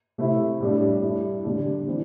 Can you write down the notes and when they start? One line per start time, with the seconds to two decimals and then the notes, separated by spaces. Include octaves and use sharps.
0.18 C3 A3 C4 E4
0.60 A2 G3 D4
1.02 A2 G3 E4
1.45 D3 G3 D4
1.87 E3 C4